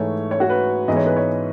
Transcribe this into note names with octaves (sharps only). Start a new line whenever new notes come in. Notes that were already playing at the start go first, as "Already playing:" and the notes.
Already playing: G#2 E3 A3 C#5
C#5
F#4
B4
G#2 E3 G#3 B3 D#5
C#5
B4
C#5